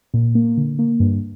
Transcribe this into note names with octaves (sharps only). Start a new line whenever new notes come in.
A#2
A#3
D3
A#3
G2